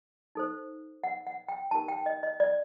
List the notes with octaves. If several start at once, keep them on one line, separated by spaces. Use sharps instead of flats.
D#4 A4 C5
F#5
F#5
G5
D#4 G4 A#4 A5
G5
D#5
D#5
D5